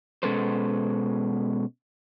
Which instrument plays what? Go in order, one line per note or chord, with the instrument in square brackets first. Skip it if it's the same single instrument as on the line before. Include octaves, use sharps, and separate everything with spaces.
[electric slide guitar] B2 G#3 C#4 A4 B4 C5